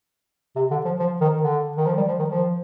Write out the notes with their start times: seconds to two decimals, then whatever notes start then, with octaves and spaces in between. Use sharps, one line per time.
0.56 C3
0.71 D3
0.85 F3
0.99 F3
1.21 D#3
1.43 D3
1.77 D#3
1.87 F3
1.97 G3
2.08 F3
2.19 D#3
2.30 F3